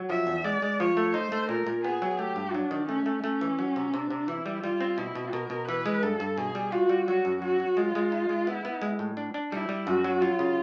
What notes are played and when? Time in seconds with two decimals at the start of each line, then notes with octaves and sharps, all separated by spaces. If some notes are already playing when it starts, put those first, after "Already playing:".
Already playing: F#3
0.10 F3 E5
0.27 E2
0.44 G#3 D5
0.62 G#3
0.80 F3 C#5
0.97 A3
1.14 D#4 C5
1.32 A3
1.49 A#2 A#4
1.67 A#2
1.84 B3 G#4
2.02 F#3
2.19 A3 G4
2.36 G2
2.54 F#3 D4
2.71 D#3
2.89 A3 C#4
3.06 A3
3.24 A3 C#4
3.41 E3
3.59 F#3
3.76 C3
3.94 C3 D4
4.10 C3
4.28 E3 E4
4.46 G3
4.63 G3 F4
4.81 C4
4.98 B2 E4
5.15 B2
5.33 B2 A#4
5.50 B2
5.68 E3 B4
5.86 G#3
6.02 G2 A4
6.20 G2
6.37 B2 G#4
6.55 G3
6.72 F4 F#4
6.89 G3
7.07 F#3 F#4
7.25 F#2
7.42 F#3 F#4
7.60 F#3
7.77 G#3 F4
7.95 G#3
8.12 D#4
8.29 G#3
8.47 B3 E4
8.65 B3
8.82 G#3
8.99 A2
9.17 D4
9.34 D4
9.52 G3 E4
9.69 G3
9.87 F#2 F#4
10.04 F#3
10.21 F#3 F4
10.39 C#3